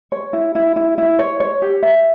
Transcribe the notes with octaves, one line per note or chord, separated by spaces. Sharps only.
C#5
E4
E4
E4
E4
C#5
C#5
G4
E5